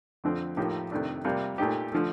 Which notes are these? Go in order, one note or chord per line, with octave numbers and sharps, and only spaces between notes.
F2 D3 F3 C4
A2 F3 A#3 D#4 G4
F2 C3 D#3 A3 D4
C3 G3 A#3 F4
A#2 A3 D#4 G4
D3 F3 A3